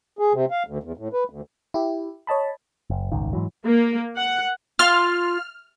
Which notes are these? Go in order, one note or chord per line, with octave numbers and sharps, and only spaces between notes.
G#4
C3
F5
D2
E2
A2
B4
D2
E4 G4
C#5 D#5 A5 B5
F#1
D#1 G#1 C#2 D#3
G#2 E3 F#3
A#3
F#5
F4 F6